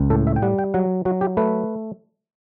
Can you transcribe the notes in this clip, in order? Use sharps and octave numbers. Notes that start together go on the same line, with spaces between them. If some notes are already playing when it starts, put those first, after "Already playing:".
Already playing: C#2
A2 A4
E5
G5
G3 F#5
G5
F#3 F#5
F#3 F#4
G4
A3 B4